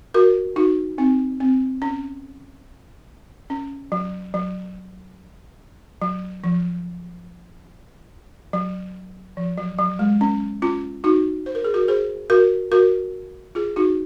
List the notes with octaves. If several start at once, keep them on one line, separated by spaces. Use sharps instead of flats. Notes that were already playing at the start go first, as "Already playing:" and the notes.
F#4 A#4
D#4 F#4
C4 D#4
C4
C#4
C#4
F#3
F#3
F#3
F3
F#3
F3
F#3
F#3
G#3
C#4
C#4 F4
D#4 F#4
C5
A#4
G#4
F#4 A#4
G#4 C5
F#4 A#4
F#4 A#4
F4 G#4
D#4 F#4